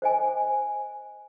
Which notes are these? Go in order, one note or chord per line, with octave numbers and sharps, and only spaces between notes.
C5 D#5 G#5